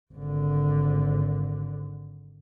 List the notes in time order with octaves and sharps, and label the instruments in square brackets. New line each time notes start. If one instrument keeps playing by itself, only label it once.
[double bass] G#1 D3